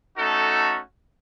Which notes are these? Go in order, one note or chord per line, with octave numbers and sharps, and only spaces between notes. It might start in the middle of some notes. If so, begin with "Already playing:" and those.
A3 C#4 D#4 F#4 A4